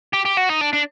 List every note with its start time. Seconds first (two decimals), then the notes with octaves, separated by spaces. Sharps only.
0.14 G4
0.26 G4
0.37 F#4
0.49 D#4
0.61 D4
0.73 D4